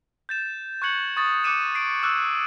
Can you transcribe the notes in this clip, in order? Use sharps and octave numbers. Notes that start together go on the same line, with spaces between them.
G6 A6 E7
C#6 F#6 G#6 C#7 F#7
C#6 D#6 A6
D6 F#6 C#7 D#7 E7
C7 D7
D6 E6 F#6